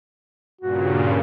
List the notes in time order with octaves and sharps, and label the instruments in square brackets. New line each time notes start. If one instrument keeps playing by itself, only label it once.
[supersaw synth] G2 A#2 C#3 [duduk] F#4